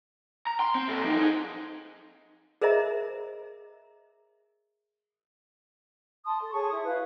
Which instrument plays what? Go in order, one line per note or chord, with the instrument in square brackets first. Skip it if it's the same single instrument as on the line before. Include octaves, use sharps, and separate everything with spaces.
[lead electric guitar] A#5
C6
C4
A#2 A4
F3 D#4
D#4 G#4
[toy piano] G#4 A#4 C5 D#5 E5 A#5
[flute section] A5 C6 D#6
A4
G#4 C#5 A5 C#6
E4 D#6
E4 F#4 B4 F5